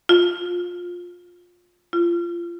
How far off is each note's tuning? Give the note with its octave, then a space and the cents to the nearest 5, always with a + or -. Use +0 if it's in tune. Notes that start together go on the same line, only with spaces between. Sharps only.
F4 +20
F4 -25